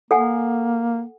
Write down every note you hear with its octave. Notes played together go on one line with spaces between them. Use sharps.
A#3 A4 F#5 G#5